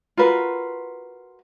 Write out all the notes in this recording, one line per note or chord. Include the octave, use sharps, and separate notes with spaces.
F4 F#4 A#4 B4